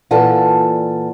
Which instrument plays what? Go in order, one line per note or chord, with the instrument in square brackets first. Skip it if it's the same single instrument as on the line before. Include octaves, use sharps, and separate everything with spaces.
[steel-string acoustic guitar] A#2 E3 F4 A4 F#5 A5